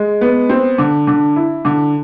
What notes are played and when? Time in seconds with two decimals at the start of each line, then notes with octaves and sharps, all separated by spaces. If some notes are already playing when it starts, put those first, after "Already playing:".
Already playing: G#3
0.21 B3
0.49 C4
0.78 D3
1.07 D3
1.36 E4
1.65 D3